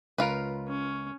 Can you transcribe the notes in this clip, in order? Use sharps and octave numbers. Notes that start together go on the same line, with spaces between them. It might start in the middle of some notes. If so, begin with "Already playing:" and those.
C#2 F4 A#4 B4
C#4